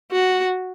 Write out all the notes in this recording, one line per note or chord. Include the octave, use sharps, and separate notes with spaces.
F#4